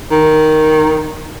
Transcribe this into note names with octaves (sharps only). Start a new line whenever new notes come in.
D#3